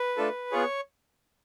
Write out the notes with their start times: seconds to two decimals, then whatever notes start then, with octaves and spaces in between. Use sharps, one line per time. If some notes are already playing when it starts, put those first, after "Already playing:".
Already playing: B4
0.17 A3 D4 F4 A4
0.52 B3 F4 G#4 C#5